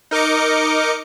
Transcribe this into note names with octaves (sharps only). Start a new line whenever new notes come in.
D#4 A#4 D#5 D6 C#7